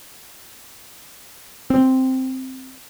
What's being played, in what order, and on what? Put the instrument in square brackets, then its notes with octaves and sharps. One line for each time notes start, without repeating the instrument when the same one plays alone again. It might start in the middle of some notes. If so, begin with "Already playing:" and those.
[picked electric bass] C4